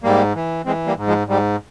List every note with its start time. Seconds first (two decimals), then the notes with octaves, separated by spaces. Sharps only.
0.03 G#2 G3 A#3
0.35 E3
0.65 E3 G#3 C4
0.87 G3 A#3
0.96 G#2
1.07 F3 G#3
1.27 G#2 G3